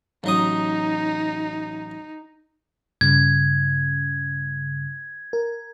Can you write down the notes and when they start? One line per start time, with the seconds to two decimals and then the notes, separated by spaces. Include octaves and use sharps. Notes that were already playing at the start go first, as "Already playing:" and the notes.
0.24 A1 F#3 D#4 D#6
3.01 G2 C#3 G#6
5.33 A#4